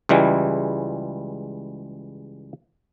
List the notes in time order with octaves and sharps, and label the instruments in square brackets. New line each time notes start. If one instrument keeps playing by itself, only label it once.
[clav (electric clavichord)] C#2 E3 G3 G#3